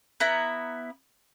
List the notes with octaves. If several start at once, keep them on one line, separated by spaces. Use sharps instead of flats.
B3 E4 A#5